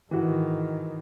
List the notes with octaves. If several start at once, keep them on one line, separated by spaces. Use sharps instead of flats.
G#2 D#3 E3 F#4